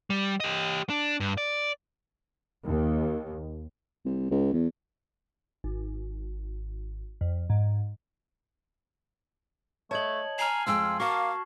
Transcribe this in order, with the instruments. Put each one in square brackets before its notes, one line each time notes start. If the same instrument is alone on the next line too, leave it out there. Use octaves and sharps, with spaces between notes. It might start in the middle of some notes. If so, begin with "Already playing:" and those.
[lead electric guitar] G3
G4 D#5
D4
G2
D5
[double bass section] D#2
[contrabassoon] C2
C#2
E2
[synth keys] G#1
F2
G#2
[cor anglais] A3 [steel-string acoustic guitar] C#5 D#5 [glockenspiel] A5 G#6 F#7
[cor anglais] G#5 [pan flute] A#5 [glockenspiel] F6 C7
[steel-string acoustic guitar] F2 G#3 G5 [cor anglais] F4 [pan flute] E6
[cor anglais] A#3 [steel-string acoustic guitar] F#4 A5 [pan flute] F5 [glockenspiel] C#6